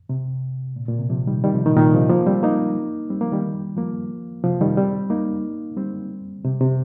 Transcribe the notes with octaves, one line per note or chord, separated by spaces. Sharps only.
C3
A#2
A#2
C3
C3 F3
D#3 G3
D#3 G3
C3 F3
A#2 D#3
A#2 D#3
C3 F3
F3 A#3
G3 C4
A#3 D#4
G3 C4
F3 A#3
D#3 G3
F3 A#3
C3 F3
D#3 G3
G3 C4
A#3 D#4
G3 C4
C3
C3